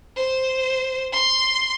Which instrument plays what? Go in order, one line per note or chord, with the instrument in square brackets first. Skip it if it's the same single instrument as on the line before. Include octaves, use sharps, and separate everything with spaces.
[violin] C5
C6